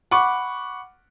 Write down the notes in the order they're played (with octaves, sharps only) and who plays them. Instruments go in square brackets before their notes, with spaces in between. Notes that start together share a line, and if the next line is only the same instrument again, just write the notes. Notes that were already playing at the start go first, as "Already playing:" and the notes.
[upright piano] F#5 B5 C#6 D6